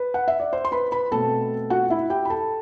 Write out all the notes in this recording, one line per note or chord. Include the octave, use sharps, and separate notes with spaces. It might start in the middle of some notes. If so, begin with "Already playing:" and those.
Already playing: B4
F#5
E5
D5
C5
C6
B4 B5
B4 B5
B2 A3 C4 A4 A5
F#4 F#5
E4 E5
G4 G5
B5
A4 A5